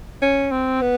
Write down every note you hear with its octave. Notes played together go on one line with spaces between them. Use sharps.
C#4
C4
B3